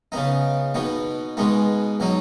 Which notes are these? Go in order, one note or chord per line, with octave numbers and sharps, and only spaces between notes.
C#3 B3 D#4
B2 B3 D#4
B2 G#3 B3 D#4
B2 F#3 D#4